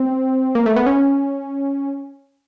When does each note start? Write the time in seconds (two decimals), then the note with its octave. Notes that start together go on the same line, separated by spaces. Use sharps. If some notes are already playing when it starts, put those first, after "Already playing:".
Already playing: C4
0.55 A#3
0.66 A3
0.76 B3
0.86 C#4